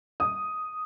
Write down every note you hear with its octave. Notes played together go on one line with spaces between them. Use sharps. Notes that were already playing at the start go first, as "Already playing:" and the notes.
D#6